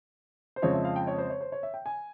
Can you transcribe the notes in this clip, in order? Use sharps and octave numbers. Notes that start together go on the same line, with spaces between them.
C5
F2 C#3 F3 G#3 C4 C#5
E5
F5
G5
C#5
C5
C#5
C5
C#5
E5
G5
G#5